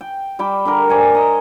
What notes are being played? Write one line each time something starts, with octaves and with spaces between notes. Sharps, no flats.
G5
G3 G5 B5 D6
D3 G4 A#4
C5 D5 G#5 C#6
D#5 A#5